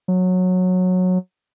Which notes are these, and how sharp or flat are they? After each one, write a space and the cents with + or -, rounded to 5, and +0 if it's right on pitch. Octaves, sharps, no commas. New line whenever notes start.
F#3 -15